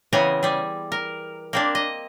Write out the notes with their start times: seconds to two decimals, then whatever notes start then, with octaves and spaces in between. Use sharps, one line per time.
0.13 C#3 E3 B3 C4 G#5 A#5
0.43 G3 G#4
0.92 A#4
1.53 A#3 C4 D4
1.75 D#5